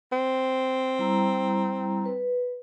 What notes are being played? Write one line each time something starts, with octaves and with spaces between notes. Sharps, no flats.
C4
G3 E4 A#5
B4